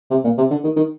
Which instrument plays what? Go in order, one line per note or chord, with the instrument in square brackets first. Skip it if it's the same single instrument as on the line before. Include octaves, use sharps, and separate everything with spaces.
[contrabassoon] C3
A#2
C3
D3
D#3
D#3